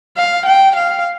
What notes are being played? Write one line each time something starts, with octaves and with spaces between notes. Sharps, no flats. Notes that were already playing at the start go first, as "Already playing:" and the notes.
F5
G5
F5